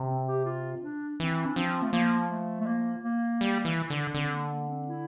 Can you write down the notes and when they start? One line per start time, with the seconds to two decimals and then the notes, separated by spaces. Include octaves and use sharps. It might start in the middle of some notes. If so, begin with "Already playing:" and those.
Already playing: C3
0.08 C4
0.28 G4
0.46 F4
0.82 D4
1.20 E3 C4
1.46 D4
1.56 F3 C4
1.82 A3
1.93 F3 A#3
2.30 A3
2.60 A3
2.66 A#3
3.03 A#3
3.41 G3
3.65 E3
3.90 D3
4.14 D3 C4
4.32 A#3
4.51 A#3
4.69 C4
4.88 E4